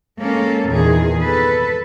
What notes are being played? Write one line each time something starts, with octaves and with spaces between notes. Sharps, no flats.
G#3 A#3 C#4 A4
E2 A#2 D#3 G#4
A4 B4